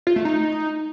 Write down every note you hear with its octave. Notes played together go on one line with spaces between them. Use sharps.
F4
A3
D#4